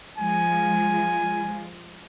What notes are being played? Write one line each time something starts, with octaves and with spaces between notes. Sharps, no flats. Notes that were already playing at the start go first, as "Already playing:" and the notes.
F3 G#3 F4 G#5